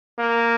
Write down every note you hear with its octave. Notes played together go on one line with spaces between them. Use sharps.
A#3